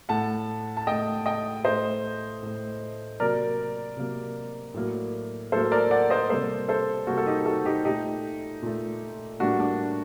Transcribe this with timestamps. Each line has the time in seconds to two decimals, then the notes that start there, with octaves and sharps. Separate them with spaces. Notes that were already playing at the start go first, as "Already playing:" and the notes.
0.09 A2 A3 F#5 A5
0.77 A5
0.87 A2 A3 D#5 G5
1.26 D#5 G5
1.64 A2 A3 C5 D#5
2.43 A2 A3
3.20 C3 F#3 A#3 A#4 D5
3.97 C3 F#3 A#3
4.74 A2 F#3 A#3
5.52 A2 F#3 A#3 A4 C5
5.72 A#4 D5
5.91 D5 F#5
6.10 C5 D#5
6.29 C3 G3 A#3 A4 C5
6.69 A4 C5
7.07 C3 G3 A#3 F#4 A4
7.17 A4
7.26 D#4 G4
7.46 F#4 A4
7.65 D#4 G4
7.85 A#2 A3 D#4 G4
8.62 A#2 A3
9.40 A2 G3 A#3 D4 F#4
9.60 D4